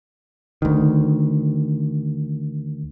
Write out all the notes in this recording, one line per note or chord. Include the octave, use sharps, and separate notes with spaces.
D2 D#3